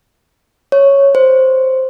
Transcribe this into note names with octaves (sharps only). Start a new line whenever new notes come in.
C#5
C5